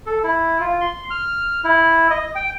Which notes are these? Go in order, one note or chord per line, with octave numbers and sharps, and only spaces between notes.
A4
E4
F4
C6
F6
E4
D#5
G5